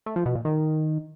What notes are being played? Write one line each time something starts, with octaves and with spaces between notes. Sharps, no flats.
A3
F3
B2
A#2
D#3